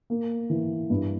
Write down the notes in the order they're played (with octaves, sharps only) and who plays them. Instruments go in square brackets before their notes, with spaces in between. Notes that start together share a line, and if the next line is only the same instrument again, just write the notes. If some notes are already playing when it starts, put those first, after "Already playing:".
[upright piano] A#3
E3
G2